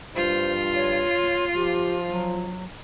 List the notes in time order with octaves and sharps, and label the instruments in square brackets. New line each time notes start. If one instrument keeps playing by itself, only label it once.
[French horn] G2 [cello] F4 [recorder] C5
[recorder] C#5
[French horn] F3 [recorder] G4
[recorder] F#3